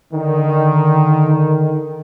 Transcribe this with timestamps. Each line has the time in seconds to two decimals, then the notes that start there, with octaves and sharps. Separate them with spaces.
0.13 D3 D#3